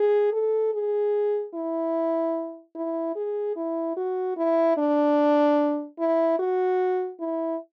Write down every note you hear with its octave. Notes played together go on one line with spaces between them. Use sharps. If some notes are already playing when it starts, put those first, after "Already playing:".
Already playing: G#4
A4
G#4
E4
E4
G#4
E4
F#4
E4
D4
E4
F#4
E4